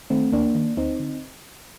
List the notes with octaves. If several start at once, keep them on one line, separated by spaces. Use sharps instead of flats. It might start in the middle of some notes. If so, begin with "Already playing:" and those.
D#3 A3 C4
D#2 A#3 D4
D#3
D2 C4 D#4
D3